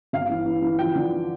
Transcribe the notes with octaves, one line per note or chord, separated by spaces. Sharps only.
G1 F5
E3
E3
E3
F3 G5
D3